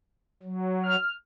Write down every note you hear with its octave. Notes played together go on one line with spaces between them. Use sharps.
F#3
F6